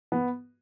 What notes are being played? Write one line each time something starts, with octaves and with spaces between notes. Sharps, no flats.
B3